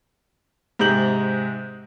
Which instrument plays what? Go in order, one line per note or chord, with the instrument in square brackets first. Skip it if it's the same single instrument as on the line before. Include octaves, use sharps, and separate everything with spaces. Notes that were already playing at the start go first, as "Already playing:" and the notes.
[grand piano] G#2 C3 G#3 G6 F#7